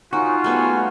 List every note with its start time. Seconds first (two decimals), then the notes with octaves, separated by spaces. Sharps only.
0.13 C#4 D#4 F4 F#4 A#4
0.44 G3 A3 B3 G#4 C#5 G#5